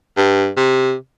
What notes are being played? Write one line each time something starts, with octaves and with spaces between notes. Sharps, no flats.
G2
C3